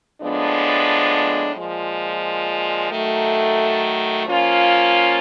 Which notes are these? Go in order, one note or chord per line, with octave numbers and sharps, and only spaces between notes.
A2 F3 G#3 B3 D4
A#2 F3 G#3
D#3 F#3 A3
F3 A#3 C#4 F4